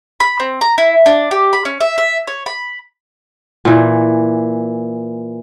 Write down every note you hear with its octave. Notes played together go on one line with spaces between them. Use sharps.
B5
C4
A#5
E4
D4
G4
B5
C#4
E5
E5
C#5
B5
A#2 E3